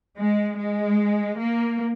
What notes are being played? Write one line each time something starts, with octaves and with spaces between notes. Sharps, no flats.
G#3
G#3
A#3